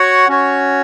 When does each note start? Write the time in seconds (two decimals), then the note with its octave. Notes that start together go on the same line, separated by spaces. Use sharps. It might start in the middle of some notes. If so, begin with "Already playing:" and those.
Already playing: F#4 C#5 F#5
0.28 C#4 F#4 C#5